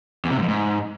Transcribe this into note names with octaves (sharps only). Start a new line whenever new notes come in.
E2
C3
G#2
F2
G#2